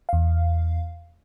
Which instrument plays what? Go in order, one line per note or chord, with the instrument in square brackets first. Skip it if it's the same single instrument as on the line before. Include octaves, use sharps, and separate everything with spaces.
[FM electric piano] E2 F5